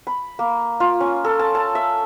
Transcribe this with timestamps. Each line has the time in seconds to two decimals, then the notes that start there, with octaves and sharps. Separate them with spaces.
0.07 B5
0.39 A#3
0.80 F4
1.01 C#4
1.25 A4
1.39 A5
1.55 A5
1.75 E5